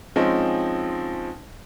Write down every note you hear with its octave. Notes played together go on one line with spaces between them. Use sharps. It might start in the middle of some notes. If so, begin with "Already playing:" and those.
F3 G#3 C4 C#4 D#4